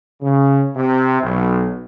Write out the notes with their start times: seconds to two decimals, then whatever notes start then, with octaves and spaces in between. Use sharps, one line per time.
0.21 C#3
0.76 C3
1.22 B1